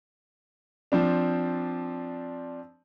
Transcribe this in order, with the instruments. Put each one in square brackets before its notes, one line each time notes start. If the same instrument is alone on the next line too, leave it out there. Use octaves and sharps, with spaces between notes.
[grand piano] F3 C4 D4